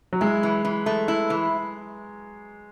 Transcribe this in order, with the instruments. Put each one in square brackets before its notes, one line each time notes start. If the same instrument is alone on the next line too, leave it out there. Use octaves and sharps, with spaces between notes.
[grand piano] F#3
[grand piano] G#3 [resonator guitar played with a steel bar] E4
[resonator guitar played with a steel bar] E3
E3
A3
E4
E3